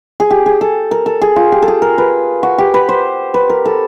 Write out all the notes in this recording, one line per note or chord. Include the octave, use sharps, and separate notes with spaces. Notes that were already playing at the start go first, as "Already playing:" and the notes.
G#4
G4
G#4
A4
A#4
A4
G#4
F4
G4
A4
G#4
A#4
B4
F#4
G4
B4
C5
B4
A#4
A4